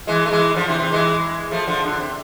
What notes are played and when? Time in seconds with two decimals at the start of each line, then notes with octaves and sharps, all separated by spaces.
0.07 E3 G#3
0.26 A3
0.31 E3 G#3
0.55 D3 F3
0.67 C3 E3
0.79 C3 E3
0.92 E3 G#3
1.51 F3 A3
1.67 D3 F3
1.84 D3
2.00 C3